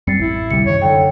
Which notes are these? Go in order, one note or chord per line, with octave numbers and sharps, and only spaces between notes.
F#2 G3 C4 A6 C7 C#7
A1 E4
D2 C3 G3 C#7
F#2 D#3 C#5
D3 C#5 G5